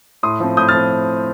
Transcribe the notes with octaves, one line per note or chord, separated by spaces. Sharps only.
A2 C6 D#6
F3 C4
A2 D#6 G6
F6 A6
F3 C4